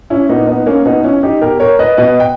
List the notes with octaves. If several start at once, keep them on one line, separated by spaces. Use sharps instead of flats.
C#4 E4
A#2 B3 D#4
B3 D#4
A#3 C#4
B2 B3 D#4
C#4 E4
D#4 G4
B2 G4 A#4
A#4 C#5
B4 D#5
B2 B4 D#5
G5